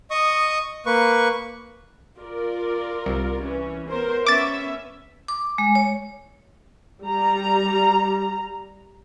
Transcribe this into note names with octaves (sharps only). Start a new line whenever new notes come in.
D#5 C#6 D#6
A#3 B4 C#6
F4 A#4 D5
C2
E3 C#4
B3 A#4 C5
B3 C#4 E5 D6 A6
D6
G#3
C#5
G3 A#5